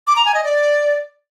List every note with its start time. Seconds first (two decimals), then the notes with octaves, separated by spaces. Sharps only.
0.07 D6
0.16 A#5
0.25 G#5
0.35 D#5
0.44 D5